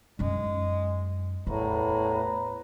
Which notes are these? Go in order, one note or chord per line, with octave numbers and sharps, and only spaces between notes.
F#2 G#3 D#4
E2 A2 A3 B4 A#5